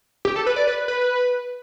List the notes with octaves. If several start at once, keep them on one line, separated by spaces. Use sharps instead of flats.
G4
A4
B4
D5
B4
B4